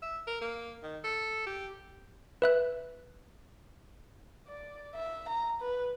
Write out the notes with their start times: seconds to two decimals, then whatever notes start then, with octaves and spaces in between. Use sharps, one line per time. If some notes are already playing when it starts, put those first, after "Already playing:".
0.02 E5
0.27 A#4
0.41 A#3
0.83 D#3
1.04 A4
1.47 G4
2.42 B4 E5 F#6
4.48 D5
4.95 E5
5.29 A#5
5.61 B4